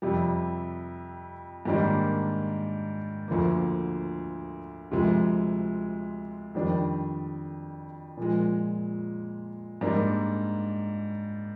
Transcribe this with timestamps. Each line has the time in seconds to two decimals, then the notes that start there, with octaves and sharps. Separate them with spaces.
0.02 F2 C3 G3
1.65 G#2 D#3 G3 A#3 D4
3.28 D2 D3 F3 A#3
4.91 D2 C3 F3 G#3
6.54 F2 D#3 G3 D4
8.17 A#2 F3 G#3
9.81 G#2 G3 A#3 D4